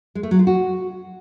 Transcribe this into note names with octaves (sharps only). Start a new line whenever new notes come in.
G#3
A3
F#3
F4
F#4